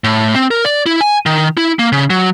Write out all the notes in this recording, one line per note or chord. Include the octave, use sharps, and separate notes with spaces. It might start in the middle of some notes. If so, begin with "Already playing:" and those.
A2
C4
A#4
D5
E4
G#5
D#3
E4
A#3
C#3
F#3